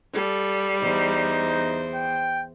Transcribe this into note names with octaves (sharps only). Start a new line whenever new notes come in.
G3 A4
E2 D#4 C5
G5